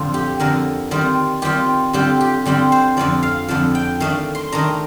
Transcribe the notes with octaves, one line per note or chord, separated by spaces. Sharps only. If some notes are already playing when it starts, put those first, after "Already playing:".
Already playing: F2 A2 D3 F3 F4
G4
F2 D3 F3 A#4
D#3 G3 C4 F4
D#3 G3 C4 F4 G4
D3 G3 C4 F4 G4
G4
D3 G3 C4 F4 G4
C5
F2 D3 F3 D5
F5
F2 D3 F3 A5
G5
D#3 A3 D4 F5
C6
D#3 A3 D4 A#5